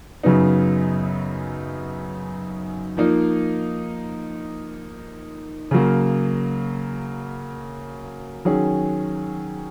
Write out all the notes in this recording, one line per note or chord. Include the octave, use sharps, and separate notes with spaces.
F#2 C#3 F#3 B3 D#4
F3 A#3 D#4
C#3 F#3 A#3
D#3 F#3 C#4 G#4